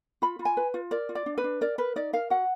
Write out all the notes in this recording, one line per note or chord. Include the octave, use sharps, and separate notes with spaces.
F4 B5
F4
G#5
B4
F4
A#4 D5
F4
D5
D4
B4
D4
A#4 D5
A#4 B4
D#4 D5
A#4 F5
F#4 F#5